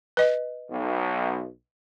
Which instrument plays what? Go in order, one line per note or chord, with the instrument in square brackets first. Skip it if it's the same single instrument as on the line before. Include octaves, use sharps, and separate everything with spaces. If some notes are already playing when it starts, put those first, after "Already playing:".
[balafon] B4 D#5
[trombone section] B1